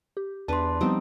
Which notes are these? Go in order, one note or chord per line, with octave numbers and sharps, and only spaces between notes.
G4
E2 D4 B4 A5 C6
F3 G3 B3 C4 D#4 G4